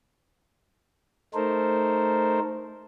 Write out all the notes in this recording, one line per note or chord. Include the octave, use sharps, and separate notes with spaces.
A3 D#4 A4 A#4 C5